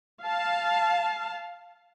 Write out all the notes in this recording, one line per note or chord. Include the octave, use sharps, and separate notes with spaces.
F5 A5